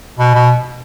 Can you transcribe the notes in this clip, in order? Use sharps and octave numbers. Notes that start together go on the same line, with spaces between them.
B2
B2